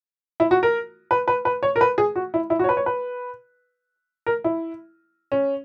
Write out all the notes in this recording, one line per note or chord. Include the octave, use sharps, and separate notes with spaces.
E4
F#4
A#4
B4
B4
B4
C#5
A#4
B4
G#4
F#4
E4
E4
F#4
C#5
B4
C#5
B4
A#4
E4
C#4